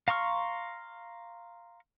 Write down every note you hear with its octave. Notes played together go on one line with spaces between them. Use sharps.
F5 A#5 C6 C#6 F6